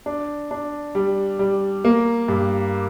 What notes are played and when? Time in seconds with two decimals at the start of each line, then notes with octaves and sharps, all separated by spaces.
0.06 D4
0.51 D4
0.95 G3
1.39 G3
1.85 A#3
2.28 G2